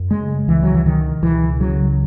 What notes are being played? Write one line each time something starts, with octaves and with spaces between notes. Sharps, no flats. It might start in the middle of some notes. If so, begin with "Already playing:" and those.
Already playing: F#2
C#3 G#3
C#2 E3
F#3
E3
B2 D#3
C#2 E3
C#3 F#3